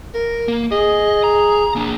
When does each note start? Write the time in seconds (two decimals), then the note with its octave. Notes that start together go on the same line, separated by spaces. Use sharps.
0.14 A#4
0.48 A#3
0.72 G#4 D#5
1.24 A#5
1.76 A#3 D4